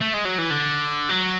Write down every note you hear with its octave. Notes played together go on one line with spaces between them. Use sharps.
A3
G#3
F#3
E3
D3
F#3